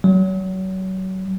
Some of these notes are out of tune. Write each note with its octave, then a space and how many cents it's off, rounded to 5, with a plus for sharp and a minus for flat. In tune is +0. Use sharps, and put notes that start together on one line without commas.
F#3 +30